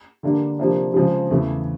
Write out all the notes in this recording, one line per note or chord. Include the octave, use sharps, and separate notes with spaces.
D3 G3 A#3 D4
C3 F3 A#3 D4
C#3 F3 G#3
E2 C#3 E3 A3